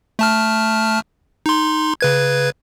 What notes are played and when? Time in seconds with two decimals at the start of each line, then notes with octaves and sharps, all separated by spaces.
0.19 A3 A5 F6
1.46 D#4 C6
2.01 C#3 B4 G#6